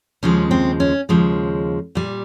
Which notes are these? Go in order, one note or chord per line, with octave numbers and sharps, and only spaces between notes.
D#2 C#3 F3 G#3 C#4
C4
C#4
D#2 C#3 F3 G#3
A#2 G3